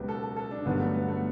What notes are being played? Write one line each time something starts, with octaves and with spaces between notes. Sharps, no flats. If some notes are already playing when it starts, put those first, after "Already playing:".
Already playing: C#2 B2 F#3 G4 B4
A4
A4
A4
D4
G1 G2 D3 F#3 B3
A3
B3
A3